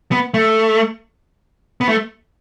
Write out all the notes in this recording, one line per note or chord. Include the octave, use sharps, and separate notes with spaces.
B3
A3
B3
A3